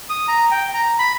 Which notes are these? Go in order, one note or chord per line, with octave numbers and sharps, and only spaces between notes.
D#6
A#5
G5
A#5
B5